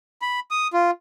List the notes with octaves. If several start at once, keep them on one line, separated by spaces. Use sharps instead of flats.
B5
D#6
F4